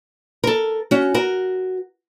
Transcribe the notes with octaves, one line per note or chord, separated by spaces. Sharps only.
A4 A#4
C#4 F#4
F#4 A#4